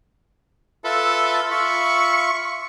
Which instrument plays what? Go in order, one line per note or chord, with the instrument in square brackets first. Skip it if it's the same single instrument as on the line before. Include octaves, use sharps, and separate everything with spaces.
[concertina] F4 B4 E5 [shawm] A4
[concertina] F4 E5 B5 [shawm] C#6